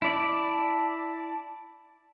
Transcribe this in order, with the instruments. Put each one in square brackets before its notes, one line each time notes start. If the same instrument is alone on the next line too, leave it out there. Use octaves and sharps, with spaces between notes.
[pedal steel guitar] E4 D5 [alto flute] A5